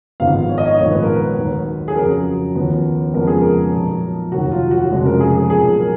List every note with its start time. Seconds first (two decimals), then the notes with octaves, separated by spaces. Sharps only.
0.20 G#1 G#2 F3 B3 F5
0.49 C#5
0.58 D#5
0.65 C#5
0.78 A#1 G#2 D#3 G#3 B3 C#5
0.90 B4
1.03 A#4
1.14 B4
1.37 D#2 D#3 F#3
1.88 G#4
1.96 F2 C#3 F#3 A#4
2.55 D#2 C#3 F3 B3
3.14 F2 C#3 G#3 B3 A#4
3.27 G#4
3.41 A#4
3.73 B1 A#2 F3
4.32 F1 D#2 D#3 F#3 F#4
4.51 F4
4.71 F#4
4.91 F1 F2 C#3 G#3
5.06 A#4
5.20 G#4
5.35 G#4
5.50 B1 A#2 F#3 G#4
5.79 A#4